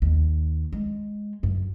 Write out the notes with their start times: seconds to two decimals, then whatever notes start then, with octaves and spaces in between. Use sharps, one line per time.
0.02 D#2
0.72 G#3
1.43 F#2